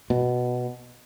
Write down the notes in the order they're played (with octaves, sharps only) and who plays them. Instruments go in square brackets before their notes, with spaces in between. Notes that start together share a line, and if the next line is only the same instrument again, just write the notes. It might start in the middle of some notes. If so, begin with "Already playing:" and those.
[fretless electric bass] B2